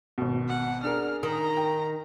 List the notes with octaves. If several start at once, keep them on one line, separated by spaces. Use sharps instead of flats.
G#1 B2
F#5
D4 G#4 A#4 F6
D#3 A#5 D#6
G5